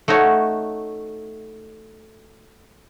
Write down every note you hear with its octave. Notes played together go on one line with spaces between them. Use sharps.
A3 D#4 F#4 C#5